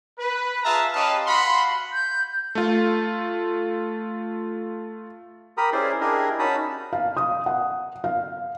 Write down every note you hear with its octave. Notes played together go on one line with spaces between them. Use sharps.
B4
F4 G#4 E5 F5 A5 A#5
C#4 G4 B4 D#5 F5 A5
F#4 F5 F#5 B5 C6
G6
A3 F4
G4 A#4 A#5 B5 D#6
C#4 E4 G#4 C5 D5 C6
D4 E4 G4 G#4 A#4 D#5
C#4 D#4 F#4 A5 B5 D#6
F5
D#6
F#5
F5